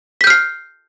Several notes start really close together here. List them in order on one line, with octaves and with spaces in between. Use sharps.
B6 G6 F6 C7